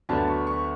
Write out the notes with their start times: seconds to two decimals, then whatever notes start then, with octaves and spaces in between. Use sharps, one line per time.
0.09 D2 D3 F#3 B3 A5
0.28 C#6
0.47 C#6